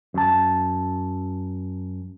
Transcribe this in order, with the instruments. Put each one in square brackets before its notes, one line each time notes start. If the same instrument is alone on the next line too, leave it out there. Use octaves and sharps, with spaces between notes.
[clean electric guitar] F#2 A5